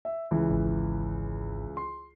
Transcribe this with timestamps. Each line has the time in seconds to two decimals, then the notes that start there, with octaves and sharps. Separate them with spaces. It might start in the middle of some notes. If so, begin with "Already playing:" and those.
0.05 E5
0.31 C#2 E3
0.50 G#1
1.77 C6